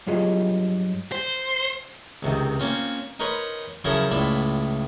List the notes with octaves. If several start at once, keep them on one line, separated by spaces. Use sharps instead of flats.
G2 F#3 F4 G#4 C#5 D#5
C5
C#2 C3 D#3
A#3 C4 C#4 F4
D#4 A#4 B4 C#5 B5 C6
C#3 F3 F#3 E4 A4 A#4
C#2 A2 F4 D5 E5 B5